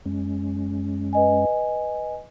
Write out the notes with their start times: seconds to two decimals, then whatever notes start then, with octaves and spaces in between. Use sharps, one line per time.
0.06 F#2 G#3 C#4
1.13 B4 D#5 G#5